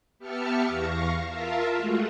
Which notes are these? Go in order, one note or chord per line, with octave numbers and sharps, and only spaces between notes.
B3 G4 E5 A5 F6 C#7
E2 F5 C#6 A#6
F4 A#4 E5 F5 A5
G#3 A3 F4 F#4